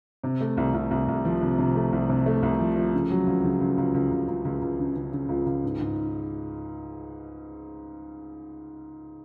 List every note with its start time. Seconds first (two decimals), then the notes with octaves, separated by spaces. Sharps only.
0.24 C3
0.41 A3
0.57 C2
0.74 C2
0.91 C2
1.08 C2
1.25 F3
1.41 C3
1.59 C3
1.75 A3
1.93 C2
2.09 C3
2.26 A3
2.43 C2
2.59 F3
2.76 F3
2.94 C#3
3.10 F#3
3.27 C#2
3.44 C#3
3.61 C#2
3.78 C#2
3.94 C#2
4.11 C#2
4.28 C#2
4.45 C#2
4.62 C#2
4.79 C#3
4.96 C#3
5.12 C#3
5.29 C#2
5.46 C#2
5.64 G#2
5.80 G#2